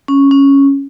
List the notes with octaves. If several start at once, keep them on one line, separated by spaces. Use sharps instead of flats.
C#4
C#4